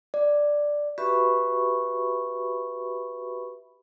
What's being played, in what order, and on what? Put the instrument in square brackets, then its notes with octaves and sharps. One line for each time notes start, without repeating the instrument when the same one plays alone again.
[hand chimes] D5
[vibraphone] F#4 G4 B4 E5 B5 C#6